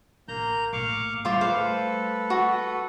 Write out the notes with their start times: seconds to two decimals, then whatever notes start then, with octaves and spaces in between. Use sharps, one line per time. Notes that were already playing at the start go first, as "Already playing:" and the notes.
0.28 A1 A#3 A#5 G6
0.73 A#1 A2 F5 C#6 D6
1.25 G3 A3 F4 C5 E5 F5 C6 D6
1.41 A4 B4 C5 F5
2.30 F#4